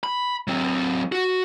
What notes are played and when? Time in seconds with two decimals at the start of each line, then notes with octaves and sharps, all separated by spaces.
0.04 B5
0.48 F#3 C4
1.12 F#4